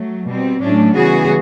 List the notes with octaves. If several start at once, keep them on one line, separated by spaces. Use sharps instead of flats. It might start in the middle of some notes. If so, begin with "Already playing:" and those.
Already playing: F#3 A3
B2 G3 C4
A2 F#3 A3 C#4 D4
C#3 E3 G3 B3 F#4 G#4